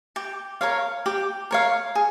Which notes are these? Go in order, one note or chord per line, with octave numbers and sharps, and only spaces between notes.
G4
A#4 C#5 F5
G4
A#4 C#5 F5
G#4